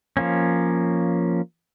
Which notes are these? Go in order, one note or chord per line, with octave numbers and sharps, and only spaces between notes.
F3 A#3 C#4